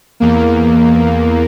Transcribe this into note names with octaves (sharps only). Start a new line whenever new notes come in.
E2 A#3